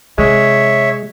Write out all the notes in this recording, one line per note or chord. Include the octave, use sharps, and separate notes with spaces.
C3 G#3 C#5 E5